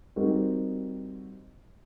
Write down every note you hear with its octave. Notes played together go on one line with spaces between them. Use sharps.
G3 C4 D#4 F#4 A#4